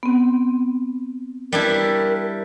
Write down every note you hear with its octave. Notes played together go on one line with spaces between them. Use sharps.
B3 C4
G3 D4 E4 A#4